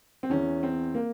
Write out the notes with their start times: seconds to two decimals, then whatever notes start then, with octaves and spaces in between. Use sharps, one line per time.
0.23 C4
0.30 E2 E3 C#4
0.63 C4
0.95 A#3